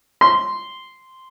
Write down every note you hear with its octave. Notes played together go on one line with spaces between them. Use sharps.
C6